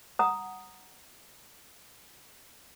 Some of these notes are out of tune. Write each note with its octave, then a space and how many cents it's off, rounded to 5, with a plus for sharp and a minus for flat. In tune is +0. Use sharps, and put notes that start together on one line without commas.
F#5 +0 A#5 +0 D#6 +0